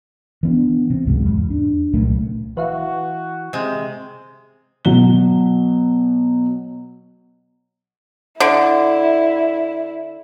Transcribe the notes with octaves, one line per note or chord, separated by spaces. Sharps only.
E3 B3 D4
C3
C#2 G#2 F#3
E2
D4
C2 A#2 F#3 A3
E3 F#4 B4 E5 F5
C3 G#3
B2 F#3 G7
D3 E4